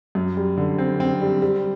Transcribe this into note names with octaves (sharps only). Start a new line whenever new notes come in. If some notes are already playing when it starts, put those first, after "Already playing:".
F#2
G3
D3
C4
C4
G3
G3